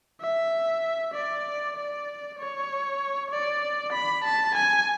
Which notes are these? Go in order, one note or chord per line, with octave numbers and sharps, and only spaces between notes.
E5
D5
D5
C#5
D5
B5
A5
G#5